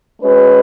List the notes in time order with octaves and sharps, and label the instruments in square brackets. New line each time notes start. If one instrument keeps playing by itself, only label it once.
[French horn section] G#3 C#4 F#4 B4